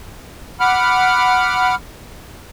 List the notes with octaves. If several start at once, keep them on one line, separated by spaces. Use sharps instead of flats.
F#5 B5 D6 F6